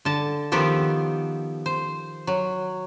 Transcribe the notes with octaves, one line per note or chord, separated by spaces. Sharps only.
D3 A5
D#3 F3 B3 G4 A4
C5
F#3